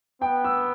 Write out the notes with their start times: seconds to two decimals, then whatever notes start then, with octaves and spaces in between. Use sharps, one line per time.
0.22 B3 G5
0.44 E6